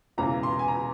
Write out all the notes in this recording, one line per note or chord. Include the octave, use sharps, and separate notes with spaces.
E1 E2 C#3 E3 A#3 A#5
C6
G#5
A#5